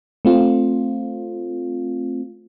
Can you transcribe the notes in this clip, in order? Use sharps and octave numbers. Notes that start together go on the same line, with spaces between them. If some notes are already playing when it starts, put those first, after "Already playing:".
A3 C4 F4